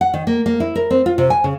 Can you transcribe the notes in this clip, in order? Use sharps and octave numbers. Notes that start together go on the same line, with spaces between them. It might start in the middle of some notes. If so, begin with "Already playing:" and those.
F#5
D#3
A#3
A#3
E4
A#4
C4
F4
C3
G#5
C#3